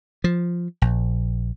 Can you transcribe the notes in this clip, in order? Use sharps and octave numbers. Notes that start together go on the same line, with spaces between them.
F3
A#1